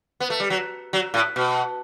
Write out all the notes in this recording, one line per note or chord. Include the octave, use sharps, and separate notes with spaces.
B3
A3
G3
F#3
F#3
A2
B2